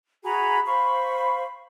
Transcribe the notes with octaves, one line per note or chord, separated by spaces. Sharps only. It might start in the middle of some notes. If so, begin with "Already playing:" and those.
F#4 G#4 A#5 B5
C5 F5 B5 C#6